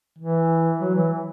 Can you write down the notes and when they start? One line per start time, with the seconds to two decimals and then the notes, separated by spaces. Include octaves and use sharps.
0.19 E3
0.80 F#3
0.95 E3